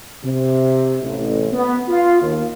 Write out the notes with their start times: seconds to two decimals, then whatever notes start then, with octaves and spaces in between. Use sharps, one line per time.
0.24 C3
1.04 A1
1.52 B3
1.88 F4
2.22 D#2